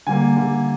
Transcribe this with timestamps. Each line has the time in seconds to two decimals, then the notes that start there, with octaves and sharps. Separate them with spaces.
0.07 D3 G3 A#3 G#5
0.37 D3 G3 A#3